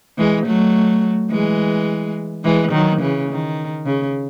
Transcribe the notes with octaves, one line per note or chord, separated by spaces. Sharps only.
E3 G#3
F#3 A3
E3 G#3
E3 G#3
D#3 F#3
C#3 E3
D#3
C#3